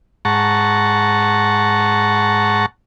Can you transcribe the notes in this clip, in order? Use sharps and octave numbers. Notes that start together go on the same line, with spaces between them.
G#2 F#5 A5 A#5 C#6